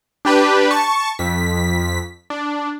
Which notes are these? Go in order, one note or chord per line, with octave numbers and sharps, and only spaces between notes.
D4 G4 B4
A5 C#6
F2 B6
D4